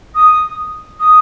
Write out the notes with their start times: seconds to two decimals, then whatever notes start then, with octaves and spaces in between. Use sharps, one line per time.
0.15 D#6
0.99 D#6